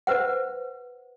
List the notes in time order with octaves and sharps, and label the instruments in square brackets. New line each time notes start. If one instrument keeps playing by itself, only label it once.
[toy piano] B4 C5 F#5